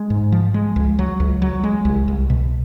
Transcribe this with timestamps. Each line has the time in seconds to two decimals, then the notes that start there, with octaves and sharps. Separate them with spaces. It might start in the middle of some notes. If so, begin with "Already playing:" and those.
Already playing: G#3
0.10 G#2
0.32 F3
0.54 G#3
0.76 C#2
0.99 F#3
1.20 C#2
1.42 F#3
1.64 G#3
1.85 C2
2.08 C2
2.30 B2